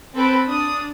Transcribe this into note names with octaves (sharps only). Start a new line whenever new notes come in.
C4 A4 B4 B5 D7
D4 D#6